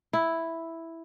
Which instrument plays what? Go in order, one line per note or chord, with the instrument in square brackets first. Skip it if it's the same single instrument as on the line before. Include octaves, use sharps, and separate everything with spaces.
[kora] E4